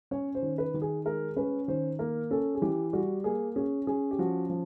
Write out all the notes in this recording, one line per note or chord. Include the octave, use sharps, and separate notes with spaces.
C#4 C#5
C5
D#3
B4
D#3
G#4
G#3 A#4
C#4 B4
D#3 C5
A#3 A#4
C#4 A4
G#4
E3 G4
G3 F#4
A#3 G#4
C#4 G#4
C#4 G#4
G4
F3 F#4
F3